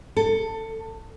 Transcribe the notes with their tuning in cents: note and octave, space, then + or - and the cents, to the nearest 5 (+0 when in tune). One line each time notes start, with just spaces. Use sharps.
A4 +20